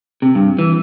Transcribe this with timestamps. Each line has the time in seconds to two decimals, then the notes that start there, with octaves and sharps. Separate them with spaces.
0.22 C3
0.35 G2
0.59 E3